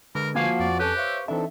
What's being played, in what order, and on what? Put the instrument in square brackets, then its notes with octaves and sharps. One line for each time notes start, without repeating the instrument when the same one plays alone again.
[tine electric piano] D3 G#3 B4 [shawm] A#4
[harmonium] F3 F#4 [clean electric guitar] A#3 F5 [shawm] G#5
[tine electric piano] F2 [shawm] D5
[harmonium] C#4 A4 C#5 [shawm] G4 [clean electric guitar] B4
[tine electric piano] C5 F5 C#6 [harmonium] C#5 E5
[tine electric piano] E3 D4 [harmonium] C4 D#4 A4 [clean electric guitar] E5